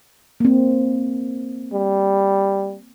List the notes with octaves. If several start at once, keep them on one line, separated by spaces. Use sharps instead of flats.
A#3 C4
G3